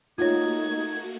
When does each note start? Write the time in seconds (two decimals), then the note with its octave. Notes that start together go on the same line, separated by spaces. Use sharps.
0.18 A3 A#3 D#4 F4 F#4 C#5 G#6